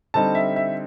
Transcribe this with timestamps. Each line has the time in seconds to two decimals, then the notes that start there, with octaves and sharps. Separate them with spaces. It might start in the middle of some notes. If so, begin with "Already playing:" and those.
0.14 D3 G3 C4 D#4 A5
0.35 E5
0.56 E5